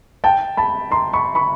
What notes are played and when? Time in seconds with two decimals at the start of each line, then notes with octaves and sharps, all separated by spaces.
0.24 G5 A5
0.57 A5 B5
0.91 A#5 C6
1.13 B5 C#6
1.35 B5 C#6